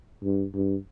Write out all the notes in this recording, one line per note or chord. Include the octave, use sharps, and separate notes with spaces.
G2
G2